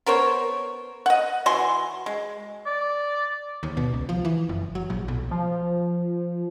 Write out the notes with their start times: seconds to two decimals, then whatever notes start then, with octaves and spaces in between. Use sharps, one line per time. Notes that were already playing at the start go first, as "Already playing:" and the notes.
0.06 B3 A#4 C5 C#5
1.06 D#5 F#5
1.46 E3 F#4 G#5 C6
2.06 G#3
2.66 D5
3.63 D#2
3.77 B2
3.94 C#2
4.09 F3
4.25 E3
4.49 F#1
4.75 F#3
4.90 A#1
5.08 B1
5.31 F3